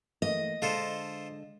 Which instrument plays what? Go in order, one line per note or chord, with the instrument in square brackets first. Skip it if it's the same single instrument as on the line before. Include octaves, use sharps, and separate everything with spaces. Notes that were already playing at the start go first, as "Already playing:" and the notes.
[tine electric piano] E3 A3 A#3 [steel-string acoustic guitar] D#5
[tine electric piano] D3 G#3 D4 [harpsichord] F4 A4 C5